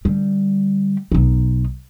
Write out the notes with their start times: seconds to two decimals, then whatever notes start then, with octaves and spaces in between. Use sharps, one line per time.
0.05 D3 G3
1.12 B1 D#4